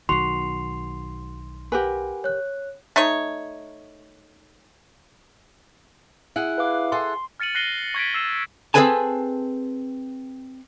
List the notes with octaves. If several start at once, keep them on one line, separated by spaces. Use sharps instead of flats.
B1 D#3 F#4 C6 C7 F7
G4 A#4 B4 F#5 G#5
C#5 F#6
A3 D#4 C#5
E4 G#4 F#5
B4 F5 D6
G#4 A4 F#5 C6
F6 A6 C#7 D#7 F#7
F#6 A#6 C7 D#7 G7
C#6 G#6 B6 D7
E6 A6 C7 E7 G7
C4 G#4 A4 B4 G#5 A5